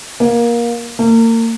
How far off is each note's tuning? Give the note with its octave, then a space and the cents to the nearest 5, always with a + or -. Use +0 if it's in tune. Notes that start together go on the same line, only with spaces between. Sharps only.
A#3 +20
A#3 -35